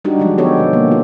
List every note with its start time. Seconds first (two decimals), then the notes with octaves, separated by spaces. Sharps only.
0.05 G3 D4 D#4 F#4 G4
0.19 D3 F3 F#3 G#3 G4
0.38 F3 B3 G4 A4 C#5
0.57 B2 D3 G3
0.73 A#3
0.88 D3 F4